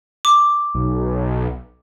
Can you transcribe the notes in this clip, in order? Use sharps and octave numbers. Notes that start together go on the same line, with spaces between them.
D6
B1